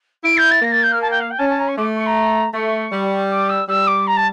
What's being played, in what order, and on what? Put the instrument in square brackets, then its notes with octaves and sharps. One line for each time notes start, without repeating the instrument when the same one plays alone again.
[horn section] E4 [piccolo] D7
[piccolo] G6
A6
[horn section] A#3 [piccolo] A#6
[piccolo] A6
G6
F6
A5
G5
F5
G5
[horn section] C#4 [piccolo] A5
[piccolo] A5
A#5
C#6
[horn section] A3 [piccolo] D6
[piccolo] C#6
A#5
[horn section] A3 [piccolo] C#6
[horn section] G3
[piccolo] D6
E6
[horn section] G3 [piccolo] E6
[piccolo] D6
A#5
A5